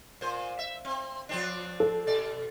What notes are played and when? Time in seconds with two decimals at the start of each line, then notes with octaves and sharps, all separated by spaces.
0.21 A#2 C5
0.59 E5
0.85 C4
1.29 F3 C4 D4
1.80 A4
2.07 B2 D5